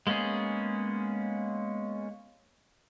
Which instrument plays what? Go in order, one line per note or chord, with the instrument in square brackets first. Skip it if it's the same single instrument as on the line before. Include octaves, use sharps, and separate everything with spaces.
[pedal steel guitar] G#3 A#3 B3 C#4 G#4